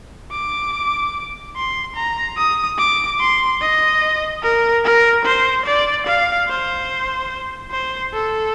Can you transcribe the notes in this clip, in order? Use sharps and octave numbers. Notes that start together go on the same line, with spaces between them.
D6
C6
A#5
D#6
D6
C6
D#5
A#4
A#4
C5
D5
F5
C5
C5
A4